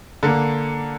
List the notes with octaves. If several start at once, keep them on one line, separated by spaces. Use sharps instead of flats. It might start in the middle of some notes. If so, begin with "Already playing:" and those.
D3 A#3